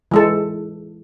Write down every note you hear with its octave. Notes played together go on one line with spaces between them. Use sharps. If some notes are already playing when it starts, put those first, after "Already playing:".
E3 G#3 A4